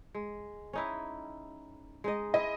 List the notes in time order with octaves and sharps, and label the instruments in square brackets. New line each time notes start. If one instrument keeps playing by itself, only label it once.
[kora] G#3
C#4 D#4 E4
G#3 D#4 D#5
[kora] E4 [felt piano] D#5